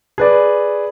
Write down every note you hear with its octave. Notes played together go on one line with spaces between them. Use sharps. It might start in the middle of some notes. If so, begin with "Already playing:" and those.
G#4 B4 D5